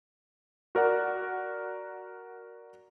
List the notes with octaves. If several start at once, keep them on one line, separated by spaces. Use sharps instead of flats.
F#4 A#4 D5 F#5